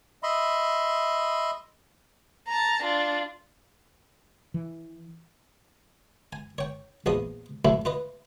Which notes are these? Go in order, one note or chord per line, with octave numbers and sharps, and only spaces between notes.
D#5 E5 B5 C6
A5 A#5
D4 F4
E3
G#5
C#5 G5
A#1 E2 F3 D#5 D#6
C2 F#2 A2 A3 E4
F4 B4 D#5